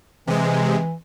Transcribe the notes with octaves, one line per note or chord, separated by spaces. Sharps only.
C3 E3 G#3